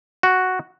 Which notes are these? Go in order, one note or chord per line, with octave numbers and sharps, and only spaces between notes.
F#4